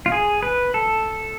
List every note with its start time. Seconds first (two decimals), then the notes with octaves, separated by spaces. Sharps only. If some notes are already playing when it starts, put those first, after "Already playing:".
0.06 F4
0.12 G#4
0.43 B4
0.74 A4